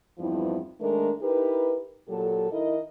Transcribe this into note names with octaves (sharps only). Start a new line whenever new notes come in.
E2 G2 F3 C4 D#4 E4
D#3 G#3 A3 D4 A#4
D#4 E4 G4 A#4 B4
A#2 F#3 G4 A4
D#3 D#4 E4 A#4 D#5